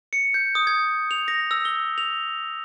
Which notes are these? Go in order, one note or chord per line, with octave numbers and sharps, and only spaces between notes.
C#7
G6
D#6
G#6
F7
A#6
E6
G7
F7